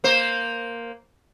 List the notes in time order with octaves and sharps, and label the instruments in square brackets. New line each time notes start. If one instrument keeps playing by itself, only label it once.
[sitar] A#3 C5